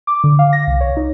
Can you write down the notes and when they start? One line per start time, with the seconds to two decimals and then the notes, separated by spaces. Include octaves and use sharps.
0.07 D6
0.24 D3
0.39 F5
0.53 A#6
0.67 C2
0.81 C#5
0.97 D#4